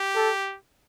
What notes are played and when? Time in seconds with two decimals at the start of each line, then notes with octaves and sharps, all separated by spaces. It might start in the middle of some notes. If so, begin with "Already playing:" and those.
Already playing: G4
0.15 A4